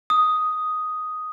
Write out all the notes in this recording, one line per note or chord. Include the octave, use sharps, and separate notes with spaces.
D#6